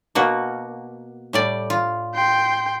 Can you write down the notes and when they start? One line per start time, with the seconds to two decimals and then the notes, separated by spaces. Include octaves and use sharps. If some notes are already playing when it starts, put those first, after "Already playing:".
0.15 B2 A#3 F#4
1.33 A2 G3 D5
1.70 F4
2.15 G5 C6